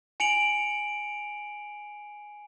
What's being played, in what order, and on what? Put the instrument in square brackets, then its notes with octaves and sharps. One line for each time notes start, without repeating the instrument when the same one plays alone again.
[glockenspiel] G#5 C#7 D7 F7 F#7